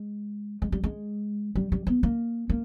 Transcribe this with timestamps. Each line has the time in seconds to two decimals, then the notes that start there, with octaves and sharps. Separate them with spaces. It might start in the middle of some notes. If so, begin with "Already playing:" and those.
Already playing: G#3
0.62 G#3
0.72 G3
0.83 G#3
1.55 G3
1.72 G3
1.87 B3
2.03 A#3
2.49 A#3